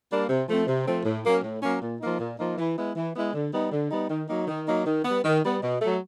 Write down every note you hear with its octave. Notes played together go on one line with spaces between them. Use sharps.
G3 A#3 D4
C3
F3 A3 C4
C3
F3 A3 C4
A2
F#3 A#3 C#4
A2
F#3 A#3 C#4
A#2
F3 A#3 D#4
A#2
F3 A#3 D#4
E3
G#3 B3 E4
E3
G#3 B3 E4
D3
G3 B3 D#4
D3
G3 B3 D#4
D#3
F#3 A#3 D#4
D#3
F#3 A#3 D#4
D#3
G3 B3
D#3
G3 B3
B2
F#3 A3